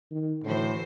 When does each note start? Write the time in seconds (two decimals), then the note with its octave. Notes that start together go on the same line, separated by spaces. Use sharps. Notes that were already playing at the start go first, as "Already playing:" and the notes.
0.11 D#3
0.44 A2 D3 E3 F#4 C5